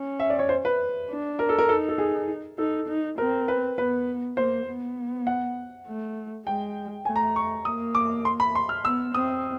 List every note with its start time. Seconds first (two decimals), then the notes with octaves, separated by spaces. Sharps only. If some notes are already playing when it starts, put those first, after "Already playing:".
Already playing: C#4
0.20 E5
0.30 D5
0.39 C#5
0.49 C5
0.65 B4
1.09 D4
1.39 A#4
1.49 A4
1.58 A#4
1.69 D#4 A4
1.89 A4
1.98 G#4
2.58 D#4 A4
2.88 D#4
3.18 C4 A#4
3.48 B4
3.77 B3 B4
4.37 A#3 C5
4.67 B3
5.27 F#5
5.87 A3
6.46 G#3 G5
7.05 A3 G#5
7.16 A#5
7.36 C#6
7.65 A#3 D#6
7.95 D6
8.25 C6
8.40 B5
8.55 C6
8.69 F6
8.85 B3 E6
9.14 C4 D#6